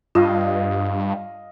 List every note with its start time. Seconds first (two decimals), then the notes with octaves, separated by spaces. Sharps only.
0.15 G2 F4 D#5 F5